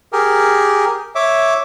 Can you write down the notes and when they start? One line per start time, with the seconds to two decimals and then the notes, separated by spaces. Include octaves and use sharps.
0.13 G4 G#4 A#4
1.15 C#5 E5 D6